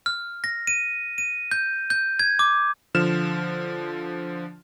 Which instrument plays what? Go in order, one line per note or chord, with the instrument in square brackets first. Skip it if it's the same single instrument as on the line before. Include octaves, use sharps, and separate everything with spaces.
[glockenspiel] F6
A#6
D#7
D#7
G6
G6
G#6
D6
[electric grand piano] D3 F3 F6 E7